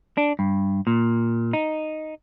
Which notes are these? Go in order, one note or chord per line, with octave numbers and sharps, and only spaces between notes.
D4
G2
A#2
D#4